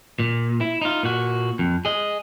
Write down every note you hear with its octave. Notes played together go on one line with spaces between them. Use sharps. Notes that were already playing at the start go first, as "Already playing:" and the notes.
A#2
E4
D#4 F4
A#2 F#4
F2
G#4 D#5